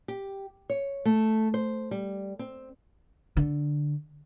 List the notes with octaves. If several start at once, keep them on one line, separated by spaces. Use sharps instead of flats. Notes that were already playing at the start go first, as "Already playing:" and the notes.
G4
C#5
A3
C5
G3
C4
D3